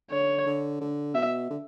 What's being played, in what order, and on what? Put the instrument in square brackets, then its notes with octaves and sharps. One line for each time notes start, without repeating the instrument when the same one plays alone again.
[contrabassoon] D3 [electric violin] C#5
[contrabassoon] D3
D3
[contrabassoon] B2 [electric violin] E5
[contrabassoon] D3